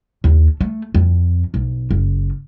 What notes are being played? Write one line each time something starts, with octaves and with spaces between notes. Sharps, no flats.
D#2
A3
F2
B1
F#1